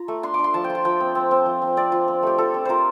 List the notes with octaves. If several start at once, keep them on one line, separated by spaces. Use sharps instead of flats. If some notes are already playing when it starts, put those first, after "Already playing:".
Already playing: F4 A#5
A3
D4 C6
D4 D6
C6
F3 A5
G5
F4
A5
F3 G5
C4
C4
C4
F3
C4
C4 D5
F4
C4
A3 G4
F4 A4
C4
F4 A#4 C5